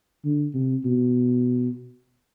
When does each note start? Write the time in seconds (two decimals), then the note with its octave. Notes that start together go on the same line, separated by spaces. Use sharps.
0.25 D3
0.54 C3
0.85 B2